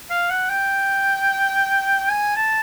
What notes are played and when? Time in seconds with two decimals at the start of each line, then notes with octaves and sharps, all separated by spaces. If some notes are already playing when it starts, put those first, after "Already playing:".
0.10 F5
0.30 F#5
0.49 G5
2.09 G#5
2.36 A5